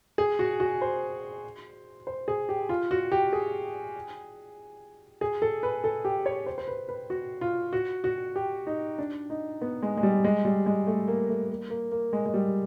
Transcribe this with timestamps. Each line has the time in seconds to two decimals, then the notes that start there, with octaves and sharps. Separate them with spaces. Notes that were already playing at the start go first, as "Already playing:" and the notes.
0.18 G#4
0.39 F#4
0.60 F#4
0.81 C5
2.07 C5
2.28 G#4
2.49 G4
2.69 F4
2.91 F#4
3.12 G4
3.33 G#4
5.21 G#4
5.42 A4
5.63 B4
5.84 A4
6.05 G4
6.26 C#5
6.46 C5
6.58 C5
6.68 B4
6.89 B4
7.10 F#4
7.41 F4
7.73 F#4
8.04 F#4
8.36 G4
8.67 D#4
8.99 D4
9.30 D#4
9.62 B3
9.83 G#3
9.97 G#3
10.03 G3
10.24 G#3
10.45 G3
10.66 G#3
10.87 A3
11.08 A#3
11.29 A3
11.49 A#3
11.70 A#3
11.92 A#3
12.13 G#3
12.26 G#3
12.34 G3